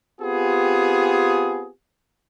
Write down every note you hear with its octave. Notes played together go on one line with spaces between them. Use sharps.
B3 C4 F4 G4 G#4